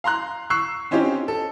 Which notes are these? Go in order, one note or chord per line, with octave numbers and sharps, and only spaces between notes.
F5 A#5 C6 F#6
C#6 E6 F#6 C7
C4 C#4 D#4 F4 G4
A4